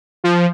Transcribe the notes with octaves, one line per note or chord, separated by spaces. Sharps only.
F3